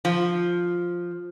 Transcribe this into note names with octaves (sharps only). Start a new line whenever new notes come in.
F3